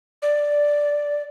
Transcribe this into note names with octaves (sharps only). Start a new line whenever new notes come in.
D5